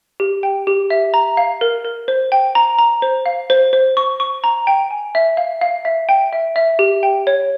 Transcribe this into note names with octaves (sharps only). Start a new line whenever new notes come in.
G4
G5
G4
E5
A#5
F5
A#4
A#4
C5
G5
A#5
A#5
C5
F5
C5
C5
C#6
C#6
A#5
G5
G#5
E5
F5
F5
E5
G5
E5
E5
G4
G5
C#5